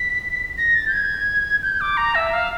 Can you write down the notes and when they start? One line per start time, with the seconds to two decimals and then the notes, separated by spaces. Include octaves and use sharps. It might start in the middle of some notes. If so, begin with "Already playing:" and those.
Already playing: B6
0.58 A#6
0.75 A6
0.87 G6
0.93 G#6
1.62 G6
1.81 D6
1.97 A#5
2.15 E5
2.33 F5